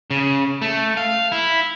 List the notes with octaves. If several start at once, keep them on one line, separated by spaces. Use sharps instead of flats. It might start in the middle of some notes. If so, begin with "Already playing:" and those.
C#3
A3
F5
E4